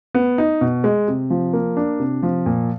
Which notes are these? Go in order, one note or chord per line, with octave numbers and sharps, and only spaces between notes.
B3
D#4
B2
G#3
C3
F3
A#3
D4
C3
F3
A#2